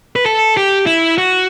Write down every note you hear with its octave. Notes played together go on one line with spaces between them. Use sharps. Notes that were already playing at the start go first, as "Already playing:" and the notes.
B4
A4
G4
E4
F#4